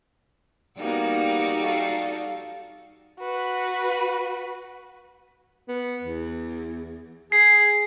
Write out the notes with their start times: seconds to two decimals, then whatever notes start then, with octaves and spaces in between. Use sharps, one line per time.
0.78 G3 A#3 B3 D#4 F#4
1.62 A4 F5
3.19 F#4 B4
5.68 B3
6.02 E2
7.32 G#4 C7